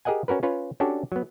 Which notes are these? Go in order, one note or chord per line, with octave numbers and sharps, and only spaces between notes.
G4 G#4 A#4 D#5 F#5 G#5
C#4 F#4 A#4 B4
C#4 F4 B4 C#5
C#4 D4 F#4 G4 A4 D5
F#3 B3